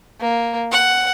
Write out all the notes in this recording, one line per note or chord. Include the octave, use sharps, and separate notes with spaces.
A#3
F#5